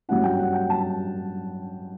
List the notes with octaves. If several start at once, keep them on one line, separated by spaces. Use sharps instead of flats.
G2 F#3 C#4 E4 F#5
G5
F#5
G5
A5